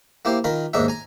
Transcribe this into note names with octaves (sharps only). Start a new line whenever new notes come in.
A#3 E4 G4 C5
D#3 F4 A#4 B5
D#2 G#2 D4 D#4 E5
G#5 A#5